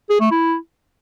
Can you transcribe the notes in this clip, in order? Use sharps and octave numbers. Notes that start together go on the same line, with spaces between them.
G#4
A3
E4